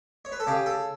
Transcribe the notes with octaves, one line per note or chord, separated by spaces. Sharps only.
C#5
B4
A4
C#3 G4
A4